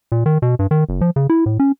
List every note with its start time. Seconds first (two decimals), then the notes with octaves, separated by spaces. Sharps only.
0.12 A#2
0.26 D#3
0.42 B2
0.59 G2
0.71 D#3
0.89 F#1
1.01 F3
1.16 C#3
1.30 E4
1.46 A2
1.60 C#4